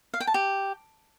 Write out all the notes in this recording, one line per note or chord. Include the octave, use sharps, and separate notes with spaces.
F5
G5
A5
G4